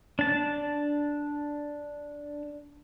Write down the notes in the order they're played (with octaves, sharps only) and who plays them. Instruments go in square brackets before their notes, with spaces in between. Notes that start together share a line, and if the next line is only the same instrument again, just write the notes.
[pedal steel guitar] D4 A5